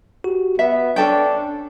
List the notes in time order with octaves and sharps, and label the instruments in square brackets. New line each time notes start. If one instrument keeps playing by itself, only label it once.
[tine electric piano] F#4 G4
[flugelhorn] B3 [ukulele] E5 [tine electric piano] B6
[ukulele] C#4 A4 G5 [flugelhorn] D4